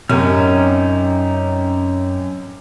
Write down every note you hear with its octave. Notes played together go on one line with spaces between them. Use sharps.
F#2 C3 C#4 D#4 F6